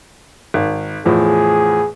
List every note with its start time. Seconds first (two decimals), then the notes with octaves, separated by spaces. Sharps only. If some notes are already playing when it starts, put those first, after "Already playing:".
0.54 G#1
1.06 E2 A2 F3 G#4